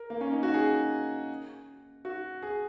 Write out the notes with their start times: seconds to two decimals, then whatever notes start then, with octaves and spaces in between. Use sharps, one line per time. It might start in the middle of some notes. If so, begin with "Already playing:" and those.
Already playing: A#4
0.10 A#3
0.21 C#4
0.32 D#4
0.43 F#4
0.54 G#4
2.05 F#4
2.42 G#4